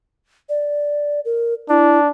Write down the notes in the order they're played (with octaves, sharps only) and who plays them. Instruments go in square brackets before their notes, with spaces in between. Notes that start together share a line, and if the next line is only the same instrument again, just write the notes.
[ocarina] D5
A#4
[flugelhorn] D4 [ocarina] E4